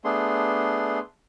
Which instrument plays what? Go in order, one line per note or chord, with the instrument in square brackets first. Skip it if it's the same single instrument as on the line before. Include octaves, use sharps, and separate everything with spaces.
[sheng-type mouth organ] A3 B3 D4 G#4 C6